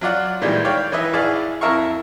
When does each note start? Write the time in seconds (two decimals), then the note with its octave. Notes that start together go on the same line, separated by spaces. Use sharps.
0.01 F#3 F4 D5 F#5
0.42 A#2 D#3 E3 G3 G#3
0.65 C#5 D5 F5 G5
0.92 E3 D#4 B4 D#5 E5
1.13 A#1 E4 G#4 D5 F5 D6
1.61 F2 E4 A#4 E5 F5 C#6